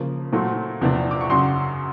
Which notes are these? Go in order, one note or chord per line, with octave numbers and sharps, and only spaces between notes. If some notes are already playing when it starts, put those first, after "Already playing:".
Already playing: C#3 F3 A#3
A#2 F#3 A3 C4
E2 C3 F3 A#3 D4
D6
C#6
F#2 C#3 F#3 C6